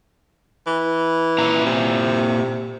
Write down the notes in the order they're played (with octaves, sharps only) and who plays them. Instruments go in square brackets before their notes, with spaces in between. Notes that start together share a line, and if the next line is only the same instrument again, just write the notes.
[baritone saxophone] E3
[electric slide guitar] A#2 E4 A#5
[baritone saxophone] C3